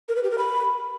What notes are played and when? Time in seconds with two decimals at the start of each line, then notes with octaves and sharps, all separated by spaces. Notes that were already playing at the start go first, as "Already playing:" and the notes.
0.09 A#4
0.16 B4
0.23 G4
0.31 A#4
0.38 B5